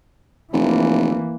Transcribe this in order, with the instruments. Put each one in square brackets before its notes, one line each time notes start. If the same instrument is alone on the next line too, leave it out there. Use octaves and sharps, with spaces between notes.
[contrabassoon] F1 [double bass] E3 A#3